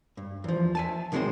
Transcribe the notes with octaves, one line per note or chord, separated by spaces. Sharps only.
G2
E2 F3
E5 G#5 A5
B1 D#3 G#3 A3 C4 C5